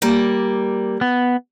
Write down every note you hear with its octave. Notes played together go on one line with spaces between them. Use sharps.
G3 A#3
B3